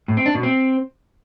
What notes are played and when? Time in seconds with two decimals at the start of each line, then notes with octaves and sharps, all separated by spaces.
0.08 A2
0.17 C4
0.26 D4
0.35 B2
0.43 C4